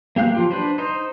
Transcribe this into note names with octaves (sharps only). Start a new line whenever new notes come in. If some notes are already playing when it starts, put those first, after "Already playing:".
A#3 G4 F5 F#6
F3 F4 G4
D4 B4 C5
D#4 C5